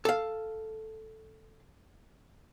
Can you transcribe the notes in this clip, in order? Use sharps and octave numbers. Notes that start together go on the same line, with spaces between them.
A4 F5